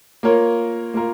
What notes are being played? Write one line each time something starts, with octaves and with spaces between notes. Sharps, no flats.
A#3 F4 A#4 C#5
A#3 F4 A#4